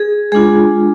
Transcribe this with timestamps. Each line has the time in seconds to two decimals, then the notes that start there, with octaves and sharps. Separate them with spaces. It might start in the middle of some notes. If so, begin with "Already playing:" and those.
Already playing: G#4
0.32 G#3 D4 F4 G#4